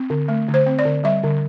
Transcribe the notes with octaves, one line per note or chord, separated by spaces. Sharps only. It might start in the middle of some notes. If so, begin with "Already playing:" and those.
Already playing: C4
D3
A3
D3
C5
C4
D5
D3
G3 E5
D3